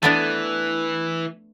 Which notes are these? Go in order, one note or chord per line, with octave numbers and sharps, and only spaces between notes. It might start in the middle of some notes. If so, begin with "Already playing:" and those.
E3 A3 B3 D4